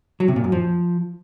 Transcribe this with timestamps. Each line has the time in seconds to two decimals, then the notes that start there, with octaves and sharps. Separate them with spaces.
0.20 F#3
0.28 C3
0.36 A#2
0.44 F#2
0.52 F3